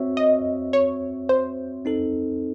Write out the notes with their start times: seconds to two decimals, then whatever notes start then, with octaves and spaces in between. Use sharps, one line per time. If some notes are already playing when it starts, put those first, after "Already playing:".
Already playing: C4 F#4 C#5 E5
0.17 D#5
0.73 C#5
1.29 C5
1.85 C4 D#4 A4